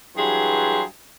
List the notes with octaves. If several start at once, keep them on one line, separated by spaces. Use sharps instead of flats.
G2 E3 F#3 G#4 C6